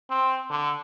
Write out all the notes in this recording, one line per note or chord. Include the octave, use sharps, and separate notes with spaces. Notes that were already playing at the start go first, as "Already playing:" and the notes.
C4
D3